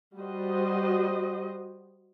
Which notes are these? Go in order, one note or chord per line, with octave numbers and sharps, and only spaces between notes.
G3 F#4 C5 D#5